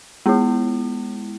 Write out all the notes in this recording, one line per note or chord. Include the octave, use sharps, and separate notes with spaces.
G#3 B3 E4